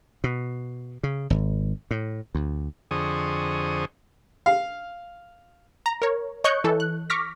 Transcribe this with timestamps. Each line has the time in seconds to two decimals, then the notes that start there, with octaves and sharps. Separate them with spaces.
0.24 B2
1.03 C#3
1.30 G#1
1.91 A2
2.35 D2
2.91 F2 D3 G#4 C5 C#6 D#6
4.46 F5
5.86 A#5
6.02 A#4 C#5
6.44 C#5 D#5 C#6 F#6 G6 C#7
6.64 E3 A4
6.80 F#6
7.10 C#6 D6 F6 A#6 B6